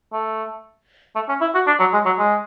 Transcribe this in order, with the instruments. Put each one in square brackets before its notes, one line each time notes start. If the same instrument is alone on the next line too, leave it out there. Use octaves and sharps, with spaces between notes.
[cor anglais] A3
A3
C#4
E4
F#4
D4
F#3
G#3
F#3
G#3